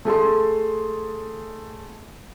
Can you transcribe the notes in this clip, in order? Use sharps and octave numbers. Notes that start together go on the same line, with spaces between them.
A3 G#4 A4 C6